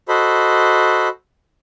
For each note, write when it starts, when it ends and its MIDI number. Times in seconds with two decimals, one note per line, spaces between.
0.08 1.08 66
0.08 1.08 69
0.08 1.08 72
0.08 1.08 75
0.08 1.08 83